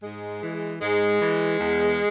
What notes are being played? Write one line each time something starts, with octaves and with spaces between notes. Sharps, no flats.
G#2 G#3
E3
G#2 G#3
E3
E2